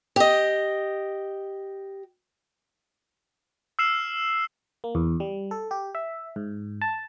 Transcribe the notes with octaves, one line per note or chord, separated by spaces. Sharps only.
G4 D#5
E6 F6 C7 E7 F#7
A#3
E2
G3
A4
G4
E5
G#2
A5